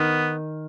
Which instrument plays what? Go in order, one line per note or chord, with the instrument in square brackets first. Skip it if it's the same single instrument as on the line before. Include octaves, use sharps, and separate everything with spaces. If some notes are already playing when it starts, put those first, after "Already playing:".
Already playing: [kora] D#3 [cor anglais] B3